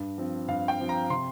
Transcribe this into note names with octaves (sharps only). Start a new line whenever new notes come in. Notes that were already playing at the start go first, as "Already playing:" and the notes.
Already playing: G2
F3 C4
G2 F5
G5
F3 C4
A#5
C3 C6